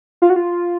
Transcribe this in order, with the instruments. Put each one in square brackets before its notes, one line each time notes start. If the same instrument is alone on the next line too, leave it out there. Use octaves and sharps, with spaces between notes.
[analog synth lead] F4
F#4
F4